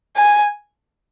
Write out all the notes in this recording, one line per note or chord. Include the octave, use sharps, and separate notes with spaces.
G#5